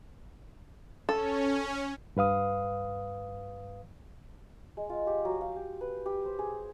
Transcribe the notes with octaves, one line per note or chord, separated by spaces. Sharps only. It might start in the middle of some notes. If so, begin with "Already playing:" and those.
C#4 A4
G2 B4 F5 D#6
G#3
F4
G4
F#3
F5
G4
B4
G4
C5
G#4